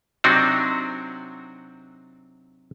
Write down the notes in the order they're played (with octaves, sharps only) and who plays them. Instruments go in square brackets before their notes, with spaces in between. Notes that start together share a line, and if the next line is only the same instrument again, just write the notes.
[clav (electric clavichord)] C3 F#3 C4 D4 D#4 F#4